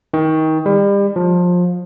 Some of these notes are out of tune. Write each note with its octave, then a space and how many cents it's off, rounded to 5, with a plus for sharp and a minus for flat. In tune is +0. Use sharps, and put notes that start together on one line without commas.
D#3 +25
G3 +35
F3 +25